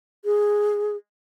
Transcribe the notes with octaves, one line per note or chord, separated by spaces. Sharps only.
G#4